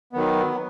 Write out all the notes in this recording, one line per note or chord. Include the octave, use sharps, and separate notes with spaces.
D#3 F#3 B3